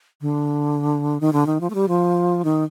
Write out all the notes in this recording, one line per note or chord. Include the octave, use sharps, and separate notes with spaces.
D3
D#3
D3
D#3
F3
A3
G3
F3
D#3